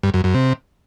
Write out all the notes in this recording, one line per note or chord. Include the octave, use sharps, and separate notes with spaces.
G2
F#2
F#2
C3